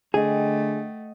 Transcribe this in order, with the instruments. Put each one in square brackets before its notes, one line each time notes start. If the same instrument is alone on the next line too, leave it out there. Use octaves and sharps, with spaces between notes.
[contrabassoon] D3 [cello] A3 [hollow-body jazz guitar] G#4 [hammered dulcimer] D#5 F#5 G5